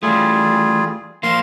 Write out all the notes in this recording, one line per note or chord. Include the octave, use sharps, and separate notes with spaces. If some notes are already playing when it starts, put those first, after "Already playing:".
E3 G3 A3 F4 G#4
F3 A#3 F4 F5 C6